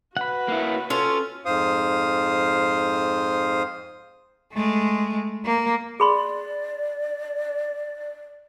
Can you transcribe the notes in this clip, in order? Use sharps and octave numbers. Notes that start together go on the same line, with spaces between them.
F#4 B4 F#5 B5
A#3 E4
C#4 F4 A4
F2 G#2 C5 F5 D#6
G#3 A3
A#3
G#4 D5 B5 C6